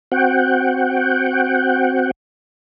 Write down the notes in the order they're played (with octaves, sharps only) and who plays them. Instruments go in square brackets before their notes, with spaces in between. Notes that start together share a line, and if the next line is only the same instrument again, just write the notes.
[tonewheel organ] C4 F#4 F#5 G5